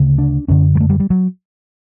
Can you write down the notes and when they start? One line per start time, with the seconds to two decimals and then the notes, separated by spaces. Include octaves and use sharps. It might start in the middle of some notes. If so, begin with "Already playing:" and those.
Already playing: D2 C#3
0.18 D4
0.48 F#2 D3 C#4
0.75 G3
0.80 A3
0.89 G3
1.00 G3
1.10 F#3